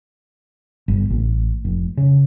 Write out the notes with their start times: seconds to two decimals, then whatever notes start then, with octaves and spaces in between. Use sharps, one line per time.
0.88 G1
1.10 A1
1.65 F1
1.97 C#3